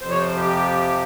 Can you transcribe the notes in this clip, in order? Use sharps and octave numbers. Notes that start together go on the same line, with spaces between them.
F2 C3 F3 C5
C#5
C5
G4